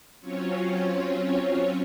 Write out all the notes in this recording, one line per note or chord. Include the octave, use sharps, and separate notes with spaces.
F#3 C4 C#4 F4 C#5